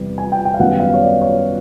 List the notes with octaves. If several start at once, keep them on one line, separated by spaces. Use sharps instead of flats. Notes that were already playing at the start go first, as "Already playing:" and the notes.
Already playing: E2 C3 E3 G3 B3
G#5
G5
G5
F5
F#2 D#3 G3 B3 F#5
F5
C#5
D5
C#5